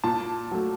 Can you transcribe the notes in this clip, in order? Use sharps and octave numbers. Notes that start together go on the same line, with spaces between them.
A#2 A5
F#3 A3